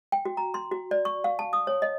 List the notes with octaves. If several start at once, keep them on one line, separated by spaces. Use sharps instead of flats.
G5
F#4
A#5
C6
F#4
D5
C#6
F5
A5
D#6
C#5
D#5